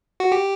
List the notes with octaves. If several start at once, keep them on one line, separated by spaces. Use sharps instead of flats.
F#4
G4